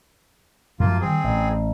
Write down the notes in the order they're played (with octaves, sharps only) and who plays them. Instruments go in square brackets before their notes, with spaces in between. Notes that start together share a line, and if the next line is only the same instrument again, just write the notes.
[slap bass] F#2 F3 G#3 [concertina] A#3 F4
[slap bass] D#3 G3 [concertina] C4 G#4
[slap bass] A1